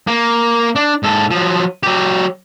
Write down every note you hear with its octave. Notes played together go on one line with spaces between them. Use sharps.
A#3
D4
G#2 A4
F3 F#3
F#3 G4